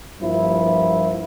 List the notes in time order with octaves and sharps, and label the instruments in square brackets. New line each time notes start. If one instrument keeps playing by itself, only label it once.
[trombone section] G2 F3 A#3 E4